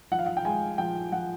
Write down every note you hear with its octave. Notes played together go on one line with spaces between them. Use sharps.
F3 F#5
F5
F#5
G5
G#3 G#5
F3 G5
F3 F#5